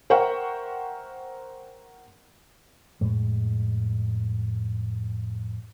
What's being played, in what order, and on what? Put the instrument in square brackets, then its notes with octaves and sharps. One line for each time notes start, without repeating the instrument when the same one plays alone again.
[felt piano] A#4 C5 E5 F#5 G5 C#6
[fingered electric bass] F2 A2 G#3